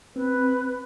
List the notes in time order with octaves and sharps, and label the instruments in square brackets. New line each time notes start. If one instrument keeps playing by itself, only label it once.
[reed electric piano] C4 [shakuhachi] B4